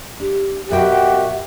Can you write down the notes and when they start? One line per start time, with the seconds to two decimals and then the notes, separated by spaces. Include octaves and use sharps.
0.20 D4 G4
0.70 F#2 B2 F#4 G4 E5 G5